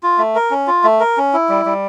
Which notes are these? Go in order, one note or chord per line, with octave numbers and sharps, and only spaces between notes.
F4
A3
A#4
C#4
F4
A3
A#4
C#4
E4
G3
G3